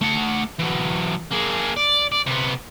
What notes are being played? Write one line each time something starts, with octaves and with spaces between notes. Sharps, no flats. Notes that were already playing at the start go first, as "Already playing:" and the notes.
A3 F#5
E3 F#3
A#3 G#4
D5
D5
C3 B3